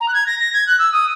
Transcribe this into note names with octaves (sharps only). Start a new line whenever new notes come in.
A#5
F#6
G#6
A#6
A#6
G#6
F#6
E6
D#6